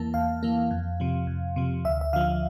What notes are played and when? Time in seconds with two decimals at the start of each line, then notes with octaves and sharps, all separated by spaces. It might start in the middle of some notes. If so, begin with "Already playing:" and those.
Already playing: E2 E3 A#3 A5
0.14 E2 F5
0.43 E3 A#3
0.71 F2
1.00 C3 F3
1.27 F2
1.56 C3 F3
1.85 D2 E5
2.01 E5
2.13 D3 F3 F5